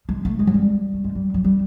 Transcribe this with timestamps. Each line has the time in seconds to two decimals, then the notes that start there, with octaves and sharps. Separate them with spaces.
0.09 G#3
0.25 A3
0.39 G#3
0.47 F#3
0.54 G3
0.94 A3
1.04 G#3
1.15 G3
1.34 F#3
1.44 G3